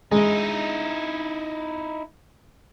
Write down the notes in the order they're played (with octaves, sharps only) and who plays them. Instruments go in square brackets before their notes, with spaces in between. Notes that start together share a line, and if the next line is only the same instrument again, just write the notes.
[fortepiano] G#3 [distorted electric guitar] D#4 E4